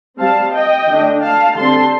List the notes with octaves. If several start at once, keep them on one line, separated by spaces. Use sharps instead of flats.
G3 C4 F5 A5
D#5 G5
D3 A3 D4
F5 A5
D3 G3 C4 A5 C6